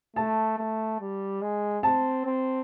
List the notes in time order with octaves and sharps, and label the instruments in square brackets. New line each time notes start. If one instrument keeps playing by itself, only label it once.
[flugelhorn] A3 [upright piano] A5
[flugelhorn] A3
G3
G#3
[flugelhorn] C4 [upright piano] A5
[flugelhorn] C4